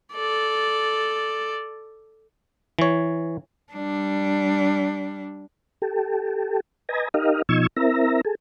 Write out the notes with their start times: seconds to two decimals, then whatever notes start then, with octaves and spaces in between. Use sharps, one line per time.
0.14 A4 D5
2.79 E3 C#5
3.73 G3 D4
5.82 G4 A4
6.89 B4 D#5 G#5 A#5
7.14 D#4 G4 A#4 D#5 F5
7.49 B2 F3 D#4 C#6 E6 G#6
7.76 C4 E4 A#4 E5 A#5
8.25 G#4 A4